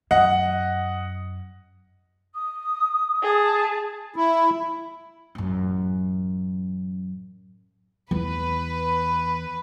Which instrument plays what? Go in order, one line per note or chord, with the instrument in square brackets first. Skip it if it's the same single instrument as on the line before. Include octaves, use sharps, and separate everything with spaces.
[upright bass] F#2 [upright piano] D#5 F#5
[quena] D#6
[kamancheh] G#4 A5
[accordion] E4
[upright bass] A1 F#2
[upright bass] E2 [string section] B4